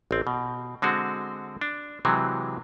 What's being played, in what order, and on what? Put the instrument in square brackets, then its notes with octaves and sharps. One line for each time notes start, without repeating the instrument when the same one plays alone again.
[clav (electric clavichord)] A1 C4
B2
D3 G#3 C4 F#4
D4
C3 E3 F#3 G#3 C4